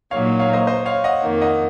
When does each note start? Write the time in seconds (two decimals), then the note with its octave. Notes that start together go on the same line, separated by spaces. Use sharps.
0.11 A#2 F#3 A#3 D#4 C#5 F5
0.39 C#5 F5
0.53 C5 D#5
0.67 C5 D#5
0.86 C#5 F5
1.04 D#5 F#5
1.22 F2 D#3 A#3 D#4
1.41 D#5 F#5